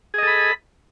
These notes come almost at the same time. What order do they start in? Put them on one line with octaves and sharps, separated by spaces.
G#4 D#5 A4 B5